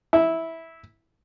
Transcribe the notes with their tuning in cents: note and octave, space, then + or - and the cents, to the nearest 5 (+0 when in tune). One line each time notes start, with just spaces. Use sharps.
E4 -10